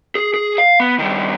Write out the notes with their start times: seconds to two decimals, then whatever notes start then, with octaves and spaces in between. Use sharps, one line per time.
0.15 G#4
0.34 G#4
0.58 F5
0.80 B3
0.99 G2 D#3